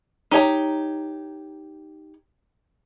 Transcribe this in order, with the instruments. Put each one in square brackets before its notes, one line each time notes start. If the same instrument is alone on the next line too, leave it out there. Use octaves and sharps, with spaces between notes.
[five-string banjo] D#4 G4 C#5 G#5 A#5